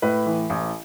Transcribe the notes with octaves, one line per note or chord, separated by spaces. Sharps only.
A2 B4
E3
A1